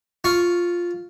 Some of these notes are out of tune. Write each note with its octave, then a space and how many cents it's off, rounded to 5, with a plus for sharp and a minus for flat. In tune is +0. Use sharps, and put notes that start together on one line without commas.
F4 +0 C#6 +0